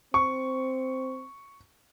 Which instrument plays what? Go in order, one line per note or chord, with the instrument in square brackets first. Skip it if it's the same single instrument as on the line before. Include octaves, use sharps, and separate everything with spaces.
[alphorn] C4 [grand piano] C#6